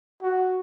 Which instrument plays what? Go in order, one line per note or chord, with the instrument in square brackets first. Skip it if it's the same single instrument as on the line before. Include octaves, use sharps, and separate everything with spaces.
[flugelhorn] F#4